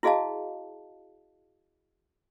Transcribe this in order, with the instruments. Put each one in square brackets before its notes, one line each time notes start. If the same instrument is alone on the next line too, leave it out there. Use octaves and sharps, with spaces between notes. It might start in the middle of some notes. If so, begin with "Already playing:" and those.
[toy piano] E4 F#4 G#4 D#5 F5 A5